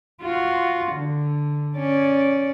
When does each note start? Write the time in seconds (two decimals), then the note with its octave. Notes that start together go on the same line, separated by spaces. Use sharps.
0.22 F4 F#4
0.92 D3
1.76 C#4 D5